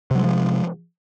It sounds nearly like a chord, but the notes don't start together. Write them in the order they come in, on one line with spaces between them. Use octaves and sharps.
C3 F#3 G#3 F3